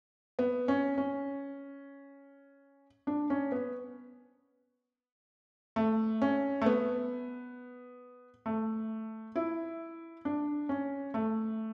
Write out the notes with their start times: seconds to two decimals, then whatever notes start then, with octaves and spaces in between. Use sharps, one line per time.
0.39 B3
0.68 C#4
0.97 C#4
3.07 D4
3.30 C#4
3.52 B3
5.76 A3
6.22 C#4
6.61 A3
6.66 B3
8.46 A3
9.35 E4
10.25 D4
10.69 C#4
11.14 A3